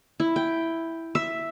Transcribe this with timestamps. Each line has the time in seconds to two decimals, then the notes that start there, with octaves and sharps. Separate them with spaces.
0.20 E4
0.36 G5
1.15 E5